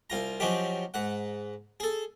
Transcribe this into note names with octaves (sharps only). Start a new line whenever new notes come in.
C2 F4 A#5
F3 F#3 C#4 D#4 G4
G#2 F#5
G#4 A4